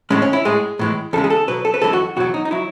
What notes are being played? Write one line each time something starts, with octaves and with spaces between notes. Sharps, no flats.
A2 E3 G#3 C#4
C#4
E4
A2 G#3 G#4
A2 E3 G#3
E2 C#3 G#3 A4
G#4
A4
B2 F#3 B4
A4
B4
F#2 E3 G#3 A4
F#4
E2 B2 F#3 F#4
D#4
D#4
F#3 E4